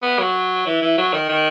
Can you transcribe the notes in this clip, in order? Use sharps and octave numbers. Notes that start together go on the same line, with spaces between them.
B3
F#3
E3
E3
F#3
D#3
D#3